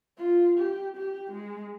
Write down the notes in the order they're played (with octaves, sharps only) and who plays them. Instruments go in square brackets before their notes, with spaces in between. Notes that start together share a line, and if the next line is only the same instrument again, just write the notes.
[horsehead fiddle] F4
G4
G4
G#3